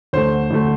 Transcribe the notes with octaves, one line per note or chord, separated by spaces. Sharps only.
D2 D3 A3 C5
D2 D3 A3